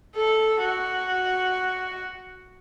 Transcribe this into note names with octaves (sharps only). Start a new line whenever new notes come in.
A4
F#4